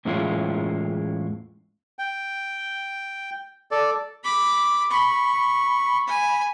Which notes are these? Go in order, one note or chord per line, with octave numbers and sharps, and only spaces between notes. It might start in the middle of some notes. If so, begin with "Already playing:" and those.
E2 A2 G#3 C#4 E4 F4
G5
A4 D5
B5 D6
B5 C#6
G#5